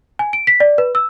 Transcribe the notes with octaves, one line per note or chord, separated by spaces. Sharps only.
G#5
D7
B6
D5
B4
E6